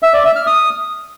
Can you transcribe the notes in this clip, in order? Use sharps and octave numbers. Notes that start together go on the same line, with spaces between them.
E5
D5
E5
F6
D#6